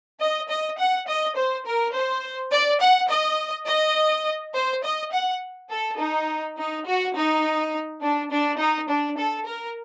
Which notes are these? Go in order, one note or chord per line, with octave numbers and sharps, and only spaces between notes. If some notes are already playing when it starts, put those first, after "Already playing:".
D#5
D#5
F#5
D#5
C5
A#4
C5
D5
F#5
D#5
D#5
C5
D#5
F#5
A4
D#4
D#4
F#4
D#4
D4
D4
D#4
D4
A4
A#4